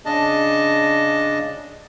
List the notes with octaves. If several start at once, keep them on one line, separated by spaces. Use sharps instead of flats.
C#3 D4 D#5 A5